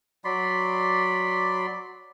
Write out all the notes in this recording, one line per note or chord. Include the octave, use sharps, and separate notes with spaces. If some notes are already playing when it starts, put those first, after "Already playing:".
F#3 D5 B5 C6